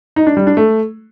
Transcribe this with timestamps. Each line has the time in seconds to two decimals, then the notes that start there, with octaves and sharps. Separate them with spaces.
0.16 D#4
0.27 D4
0.37 G3
0.47 D4
0.57 A3